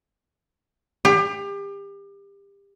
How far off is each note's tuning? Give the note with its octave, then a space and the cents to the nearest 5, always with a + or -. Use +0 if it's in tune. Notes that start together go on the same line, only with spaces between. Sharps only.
G4 +30